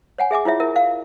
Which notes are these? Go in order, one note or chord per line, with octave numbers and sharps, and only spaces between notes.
C#5 F#5 G#5
G#4 E5 G#5 D6
E4 F4 C#5 E5
E4 A#4 E5
F5